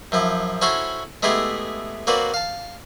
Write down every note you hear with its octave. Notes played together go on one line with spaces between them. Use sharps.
F#2 F3 E4
C#4 E4 F#4 A4 C5 C#5
G#3 A3 B3 E4 G4 G#4
A#3 C4 F#4 B4 D5
F5 A5